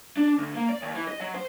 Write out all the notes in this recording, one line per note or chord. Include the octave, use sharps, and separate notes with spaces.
D4
D2
A#3
D5
D#2
E3
D#5
F#3
C5